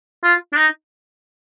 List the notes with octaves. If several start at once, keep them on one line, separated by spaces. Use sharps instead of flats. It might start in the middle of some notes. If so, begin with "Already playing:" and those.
F4
D4
D#4